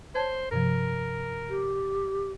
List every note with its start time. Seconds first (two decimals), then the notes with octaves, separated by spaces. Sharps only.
0.15 C5 C#5 A5 G#6
0.51 G2 C3 F3 A#4
1.50 G4